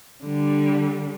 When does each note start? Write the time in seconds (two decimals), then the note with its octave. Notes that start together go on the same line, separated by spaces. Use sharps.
0.24 D3 G3